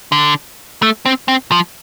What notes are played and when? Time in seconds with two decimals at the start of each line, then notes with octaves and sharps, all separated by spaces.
0.12 D3
0.82 A3
1.05 C4
1.28 C4
1.52 F3